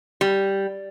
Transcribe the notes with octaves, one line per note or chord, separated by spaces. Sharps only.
G3